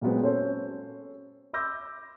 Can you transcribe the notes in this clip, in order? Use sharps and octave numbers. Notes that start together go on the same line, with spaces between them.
A#2 F#3 G#3 B3 C4
C#4 A4 C5 C#5
B5 C6 D6 E6 G6 A#6